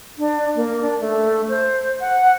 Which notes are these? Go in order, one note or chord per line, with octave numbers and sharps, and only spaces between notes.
D4
A#3
D4
A3
C5
F#5